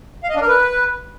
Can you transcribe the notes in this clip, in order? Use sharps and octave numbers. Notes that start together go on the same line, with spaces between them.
F5
D#5
D4
A#4
B4